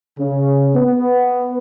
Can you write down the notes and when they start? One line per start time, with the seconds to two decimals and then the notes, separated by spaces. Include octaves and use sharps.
0.19 C#3
0.73 B3